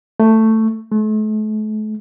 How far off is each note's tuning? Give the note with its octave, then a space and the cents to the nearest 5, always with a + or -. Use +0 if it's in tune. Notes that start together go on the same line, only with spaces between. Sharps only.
A3 +10
A3 -40